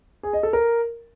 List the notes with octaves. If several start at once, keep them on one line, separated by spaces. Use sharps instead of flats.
G#4
D#5
A4
A#4